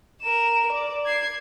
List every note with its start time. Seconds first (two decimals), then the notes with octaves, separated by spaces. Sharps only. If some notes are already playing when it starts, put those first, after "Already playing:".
0.22 A#4 E7
0.72 D5
1.06 G#6 C7